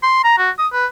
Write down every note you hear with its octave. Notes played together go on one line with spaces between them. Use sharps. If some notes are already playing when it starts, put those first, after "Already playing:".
C6
A#5
F#4
D#6
B4